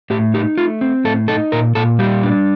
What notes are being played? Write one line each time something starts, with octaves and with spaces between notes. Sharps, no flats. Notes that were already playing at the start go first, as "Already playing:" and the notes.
A2 G4
D#4 G4
A3 F4
C4
A2 A4
D#4 A4
A#2 A#4
A#2 A4
G3 G4
D4